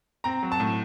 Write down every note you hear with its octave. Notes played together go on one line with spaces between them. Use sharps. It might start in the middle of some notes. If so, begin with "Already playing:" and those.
C4 A#5
F#3
A5
A2